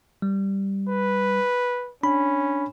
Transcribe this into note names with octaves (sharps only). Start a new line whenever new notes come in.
G3
B4
C#4 D4 B5